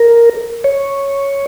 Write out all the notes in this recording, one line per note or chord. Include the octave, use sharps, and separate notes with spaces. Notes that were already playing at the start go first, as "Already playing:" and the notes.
Already playing: A#4
C#5